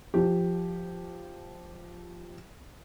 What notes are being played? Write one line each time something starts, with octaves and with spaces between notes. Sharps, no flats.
F3 G4